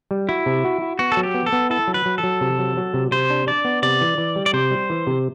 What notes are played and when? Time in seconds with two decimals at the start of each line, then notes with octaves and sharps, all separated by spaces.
0.11 G3
0.29 E4 F#4
0.46 C3
0.65 F#4
0.82 F#4
0.99 B3 F#4
1.12 A4
1.17 F#3
1.23 G4
1.34 B3
1.46 A4
1.52 B3
1.70 E4 A4
1.87 F#3
1.94 B4
2.06 F#3
2.18 A4
2.23 F#3
2.41 C3
2.59 F#3
2.77 F#3
2.94 C3
3.11 C3 C5
3.30 D4
3.47 D4 D5
3.65 B3
3.83 C3 D5
4.01 E3
4.18 E3
4.36 G3
4.46 D5
4.53 C3 C5
4.71 G3
4.90 E3
5.07 C3